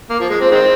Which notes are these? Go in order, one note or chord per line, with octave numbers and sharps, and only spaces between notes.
A#3
F3
G#3
C4
D#3 G#3 C4